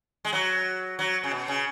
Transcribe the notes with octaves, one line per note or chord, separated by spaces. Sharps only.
G#3
F#3
F#3
C#3
B2
C#3